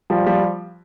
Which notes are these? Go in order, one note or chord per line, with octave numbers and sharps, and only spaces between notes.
F3 G3
F3 G3